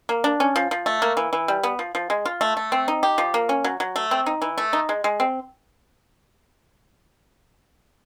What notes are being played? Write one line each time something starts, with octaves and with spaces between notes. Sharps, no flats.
A#3
D4
C#4
F3
F3
A3
A#3
E3
E3
G3
B3
F3
F3
G#3
F4
A3
A3
C4
D#4
G4
F3
A#3
C#4
F#3
F#3
A3
C4
D#4
E3
A3
D#4
G#3
G#3
C4